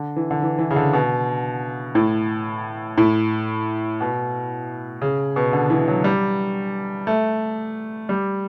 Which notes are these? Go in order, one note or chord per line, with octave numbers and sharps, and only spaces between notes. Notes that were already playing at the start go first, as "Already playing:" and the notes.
Already playing: D3
E3
D3
E3
E3
C#3
D3
B2
A2
A2
B2
C#3
B2
D3
E3
F#3
G3
A3
G3